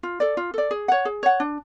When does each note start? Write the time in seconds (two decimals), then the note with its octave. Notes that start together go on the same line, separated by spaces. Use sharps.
0.03 F4
0.20 A4 D5
0.37 F4
0.54 A4 D5
0.71 G#4
0.88 C#5 F#5
1.05 G#4
1.23 C#5 F#5
1.40 D4